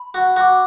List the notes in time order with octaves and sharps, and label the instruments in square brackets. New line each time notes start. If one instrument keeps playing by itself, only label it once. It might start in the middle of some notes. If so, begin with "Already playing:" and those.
Already playing: [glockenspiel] B5
[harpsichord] F#4
[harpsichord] F#4 [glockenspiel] D6 F#6